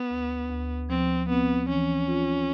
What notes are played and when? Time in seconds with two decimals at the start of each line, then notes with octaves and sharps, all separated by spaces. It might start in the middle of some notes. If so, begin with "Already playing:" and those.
Already playing: B3
0.10 D2
0.50 D2
0.89 F3 C4
1.29 B3 C4
1.68 E3 C#4
2.07 F4